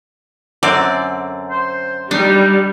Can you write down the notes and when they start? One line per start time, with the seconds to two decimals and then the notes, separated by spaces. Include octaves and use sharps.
0.63 F#2 D3 C4 D5
1.50 C5
2.11 G3 D4 D#4